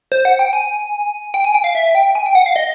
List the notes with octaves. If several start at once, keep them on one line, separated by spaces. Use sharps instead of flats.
C5
F#5
G5
G#5
G5
G#5
G5
F5
E5
G5
G#5
G5
F#5
F5
D#5